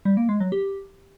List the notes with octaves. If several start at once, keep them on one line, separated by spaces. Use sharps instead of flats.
G3
A#3
G#3
F#3
G4